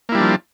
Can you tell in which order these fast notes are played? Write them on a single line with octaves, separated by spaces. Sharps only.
A#3 E4 G3 D4 F3